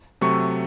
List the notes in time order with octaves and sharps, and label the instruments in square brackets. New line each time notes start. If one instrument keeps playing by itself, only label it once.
[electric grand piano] C3 F#3 A3 C#6